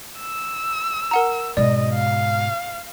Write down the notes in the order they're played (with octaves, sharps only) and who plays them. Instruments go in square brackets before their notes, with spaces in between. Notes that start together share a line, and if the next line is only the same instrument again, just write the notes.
[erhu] E6
[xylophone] A#4 F#5 A#5
[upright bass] G#2 B2 [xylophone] D5 [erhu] D#5
[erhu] F5